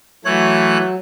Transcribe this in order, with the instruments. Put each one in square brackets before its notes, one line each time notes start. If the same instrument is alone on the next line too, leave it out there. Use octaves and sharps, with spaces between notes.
[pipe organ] E3 A3 F#6 [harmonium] F#3 [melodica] C#5